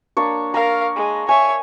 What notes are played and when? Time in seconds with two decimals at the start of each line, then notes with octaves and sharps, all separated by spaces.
0.17 A#3 D4 C#5
0.54 A#4 F5 A#5
0.96 G#3
1.29 C#5 E5 G#5